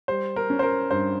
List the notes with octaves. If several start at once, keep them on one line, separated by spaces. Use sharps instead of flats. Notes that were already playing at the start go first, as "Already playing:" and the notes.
G3 C5
A#4
C#4
C5
A#4
G2 C5